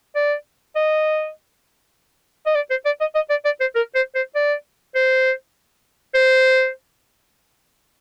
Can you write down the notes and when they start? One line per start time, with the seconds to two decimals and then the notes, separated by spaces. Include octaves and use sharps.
0.15 D5
0.75 D#5
2.46 D#5
2.55 D5
2.70 C5
2.85 D5
3.00 D#5
3.15 D#5
3.30 D5
3.45 D5
3.60 C5
3.75 A#4
3.95 C5
4.15 C5
4.35 D5
4.95 C5
6.14 C5